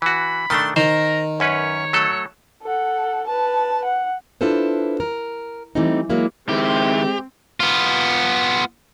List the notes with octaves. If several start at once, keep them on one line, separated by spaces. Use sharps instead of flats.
E3 F#4 B5
D#3 A3 D4 C6
D#3 A#4 C5
F#2 C#4 B4 C#5
F#3 A3 A4
A4 F#5
B4 A5
F#5
D4 E4 F4 A4 B4 C5
A#4
E3 G3 A3 C4 D#4
E3 F#3 G#3 A#3 E4
D#3 G#3 C4 E4 G4
B3 F4